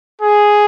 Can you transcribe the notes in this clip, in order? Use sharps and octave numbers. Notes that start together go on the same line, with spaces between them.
G#4